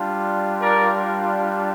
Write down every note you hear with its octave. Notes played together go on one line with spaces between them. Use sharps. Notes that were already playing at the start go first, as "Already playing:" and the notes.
Already playing: G3 D4 F4
A#4 D5